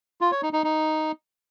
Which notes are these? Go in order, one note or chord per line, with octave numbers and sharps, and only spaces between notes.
F4
C#5
D#4
D#4
D#4